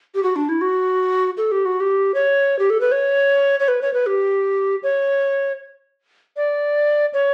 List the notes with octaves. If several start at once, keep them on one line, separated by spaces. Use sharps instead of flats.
G4
F#4
D4
E4
F#4
A4
G4
F#4
G4
C#5
G4
A4
B4
C#5
C#5
B4
C#5
B4
G4
C#5
D5
C#5